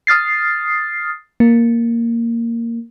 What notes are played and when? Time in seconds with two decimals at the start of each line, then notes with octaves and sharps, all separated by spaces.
0.07 D#6 F6 A6 C7
1.40 A#3